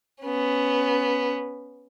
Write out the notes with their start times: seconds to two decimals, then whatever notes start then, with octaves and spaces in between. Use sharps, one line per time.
0.23 B3 C#4